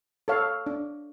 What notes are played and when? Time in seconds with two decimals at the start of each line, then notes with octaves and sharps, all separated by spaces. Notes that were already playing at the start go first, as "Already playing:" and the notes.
0.28 A4 C#5 F5
0.66 D4